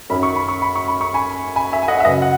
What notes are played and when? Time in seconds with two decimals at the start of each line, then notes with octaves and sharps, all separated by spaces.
0.10 F#2 D#3 F#3 C#4 B5
0.23 C#6
0.36 B5
0.48 C#6
0.62 B5
0.75 C#6
0.88 B5
1.01 C#6
1.14 G#5 B5
1.56 G#5 B5
1.73 E5 G#5
1.83 G#5
1.88 D#5 F#5
2.00 E5
2.04 F#2 B4 D#5
2.07 C#3 F#3
2.22 F#5